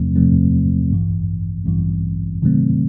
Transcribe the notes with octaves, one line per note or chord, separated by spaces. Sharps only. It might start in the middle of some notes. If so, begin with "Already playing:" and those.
Already playing: E2 C3 F3 A3 C4
E2 C3 F3 A3 C4
A1 G2 E3
A1 G2 E3
C3 D#3 F#3 A3 C4